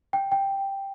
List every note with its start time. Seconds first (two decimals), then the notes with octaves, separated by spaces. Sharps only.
0.13 G5
0.32 G5